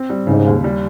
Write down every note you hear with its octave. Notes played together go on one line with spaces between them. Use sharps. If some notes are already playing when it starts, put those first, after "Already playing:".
Already playing: C4
G3
G#2 C#3
D#2
G3